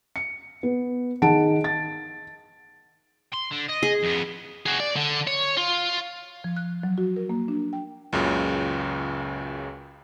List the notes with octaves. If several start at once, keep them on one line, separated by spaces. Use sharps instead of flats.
C#7
B3
D#3 G#4 F#5 A5 D7
A6
C6
D3
D#5
G#4
F2 B3
F#4 G#4
D5
D3
C#5
F4
F3
F#6
F#3
F#4
A#4
A#3
D4
G5
C#2 F#2 A#2 C#3